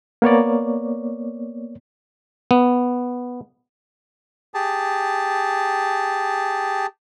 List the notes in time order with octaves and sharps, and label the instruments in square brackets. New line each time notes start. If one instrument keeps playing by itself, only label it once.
[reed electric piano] A#3 B3 C#5 D5
[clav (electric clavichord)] B3
[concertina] G4 G#4 A5